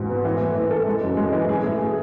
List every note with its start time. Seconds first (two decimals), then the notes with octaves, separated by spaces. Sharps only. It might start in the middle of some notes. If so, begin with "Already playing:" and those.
Already playing: G#2 E3 F#4
0.09 B3
0.25 E3
0.41 A3
0.55 E3
0.71 A4
0.87 G#3
1.02 F#2
1.17 G#3
1.32 E3
1.49 G#4
1.64 A3
1.80 G#4